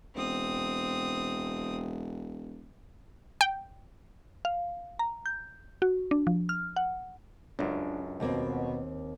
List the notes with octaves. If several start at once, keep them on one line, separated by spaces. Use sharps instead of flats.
E1 C4 D#6
G5
F5
A#5
G6
F#4
D4
F3
F6
F#5
C#2 F#2 D4
D#2 B2 A#3 C4